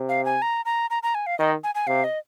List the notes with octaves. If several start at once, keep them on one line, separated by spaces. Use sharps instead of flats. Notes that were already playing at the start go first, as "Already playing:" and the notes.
Already playing: C3
F5
G#5
A#5
A#5
A#5
A#5
G#5
F5
D#3 D#5
G#5
G#5
C3 F5
D#5